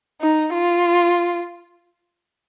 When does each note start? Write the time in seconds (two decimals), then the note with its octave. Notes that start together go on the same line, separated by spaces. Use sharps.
0.21 D#4
0.53 F4